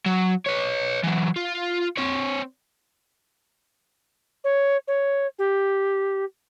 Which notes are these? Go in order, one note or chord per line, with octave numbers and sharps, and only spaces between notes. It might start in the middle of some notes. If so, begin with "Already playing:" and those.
F#3
B4 C#5
E3 F#3
F4
C4 C#5
C#5
C#5
G4